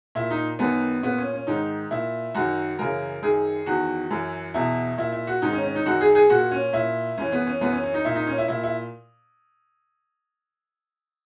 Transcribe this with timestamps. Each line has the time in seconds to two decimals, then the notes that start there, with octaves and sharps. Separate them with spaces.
0.15 A#2 E4
0.31 D#4
0.59 F#2 D#3 B3
1.03 A#2 B3
1.18 C#4
1.33 C#4
1.47 G#2 D#3 D#4
1.91 A#2 E4
2.35 F#2 D#3 F#4
2.79 F#2 C#3 E3 A#4
3.22 F#2 D#3 G#4
3.66 E2 D#3 F#4
4.10 F#2 E3
4.54 E2 B2 E4
4.98 A#2 E4
5.12 E4
5.27 F#4
5.42 G#2 D#3 D#4
5.53 C#4
5.63 C#4
5.75 D#4
5.86 F#2 D#3 F#4
6.01 G#4
6.15 G#4
6.30 A#2 F#4
6.51 C#4
6.73 A#2 E4
7.17 F#2 E3 C#4
7.32 B3
7.47 C#4
7.61 F#2 E3 B3
7.72 C#4
7.83 C#4
7.94 D#4
8.05 A#2 E4
8.15 D#4
8.27 C#4
8.38 E4
8.48 A#2 E4
8.64 E4